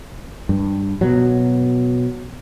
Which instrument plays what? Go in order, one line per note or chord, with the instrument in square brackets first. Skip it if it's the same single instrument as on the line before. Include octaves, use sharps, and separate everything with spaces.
[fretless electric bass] G2
B2 F#3